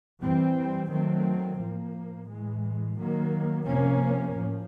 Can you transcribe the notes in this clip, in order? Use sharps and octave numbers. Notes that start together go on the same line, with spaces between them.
E3 G3 C4
D#3 F#3 A3 C4
A2 F3 A#3
A2 E3 G#3
D#3 F#3 A#3
C3 F3 A#3 C#4
A2 F3